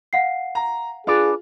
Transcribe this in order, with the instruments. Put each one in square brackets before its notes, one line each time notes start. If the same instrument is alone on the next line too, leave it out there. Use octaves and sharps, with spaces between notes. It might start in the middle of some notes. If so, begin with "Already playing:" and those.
[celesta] F5 F#5 C7
[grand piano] A#5
[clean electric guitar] D4 B4 D5 [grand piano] F4 [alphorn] G#4